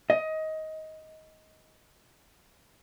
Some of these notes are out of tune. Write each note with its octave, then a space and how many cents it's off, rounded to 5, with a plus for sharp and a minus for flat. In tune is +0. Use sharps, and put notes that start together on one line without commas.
D#5 +15